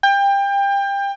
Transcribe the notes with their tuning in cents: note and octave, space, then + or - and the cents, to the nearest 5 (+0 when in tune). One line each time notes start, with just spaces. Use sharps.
G5 +25